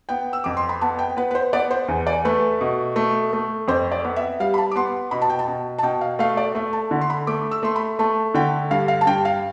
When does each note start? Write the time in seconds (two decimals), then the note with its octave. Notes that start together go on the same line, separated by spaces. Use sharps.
0.09 B3 G5
0.33 E6
0.44 F2 D6
0.57 C6
0.69 B5
0.81 B3 A5
0.99 G5
1.17 B3 B4
1.31 B4
1.35 C5
1.53 B3 D5
1.71 C5
1.88 E2
2.07 D5
2.25 A3 B4
2.61 B2
2.96 A3
3.33 A3
3.68 F2 C5
3.92 D5
4.04 B3
4.16 E5
4.40 G3 F5
4.54 B5
4.58 A5
4.71 D6
4.76 B3 C6
5.11 B2 B5
5.22 A5
5.30 G5
5.39 A5
5.48 B2
5.79 A5
5.83 B2 G5
6.01 F5
6.19 A3 F5
6.37 D5
6.55 A3 E5
6.73 A5
6.91 D3
7.01 C6
7.10 B5
7.27 A3 D6
7.51 E6
7.63 A3 C6
7.76 B5
7.99 A3 A5
8.34 D3 G5
8.71 G2 F5
8.88 F5
9.01 A5
9.07 G2 G5
9.25 F5